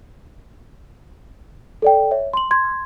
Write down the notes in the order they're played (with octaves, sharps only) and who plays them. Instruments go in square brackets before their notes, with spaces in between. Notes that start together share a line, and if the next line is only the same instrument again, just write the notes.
[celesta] A4 D5 G5
C#5 E5
C6 F#7
C6 G#6